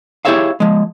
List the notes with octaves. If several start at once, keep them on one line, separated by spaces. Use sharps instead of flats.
E4 G4 G#4 C#5 E5 F5
F3 G#3